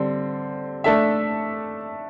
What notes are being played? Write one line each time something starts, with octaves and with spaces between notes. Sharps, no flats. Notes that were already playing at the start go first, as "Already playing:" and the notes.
Already playing: D3 G3 C4
A3 D4 A4 E5